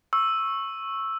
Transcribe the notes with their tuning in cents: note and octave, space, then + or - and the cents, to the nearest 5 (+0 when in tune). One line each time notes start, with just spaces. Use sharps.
C#6 -15 E6 +0